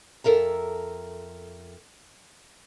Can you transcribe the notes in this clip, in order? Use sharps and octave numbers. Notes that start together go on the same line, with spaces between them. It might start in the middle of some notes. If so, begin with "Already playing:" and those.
F2 A4 A#4 E5 A#5